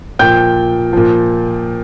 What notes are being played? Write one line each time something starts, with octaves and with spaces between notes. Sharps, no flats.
A#2 F3 G5 G6
A#2 F3